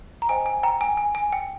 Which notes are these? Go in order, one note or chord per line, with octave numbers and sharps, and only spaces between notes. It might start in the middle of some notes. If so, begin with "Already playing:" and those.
A#5
C5 D#5 G5 G#5
G#5
G5 A#5
G#5
G#5
G#5
G5